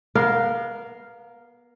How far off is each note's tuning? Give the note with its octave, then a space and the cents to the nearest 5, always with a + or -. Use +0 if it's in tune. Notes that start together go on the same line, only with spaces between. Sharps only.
B3 -30 A#4 +0 F5 +0